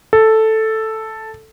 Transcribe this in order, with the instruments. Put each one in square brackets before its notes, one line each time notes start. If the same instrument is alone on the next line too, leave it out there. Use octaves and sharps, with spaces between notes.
[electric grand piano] A4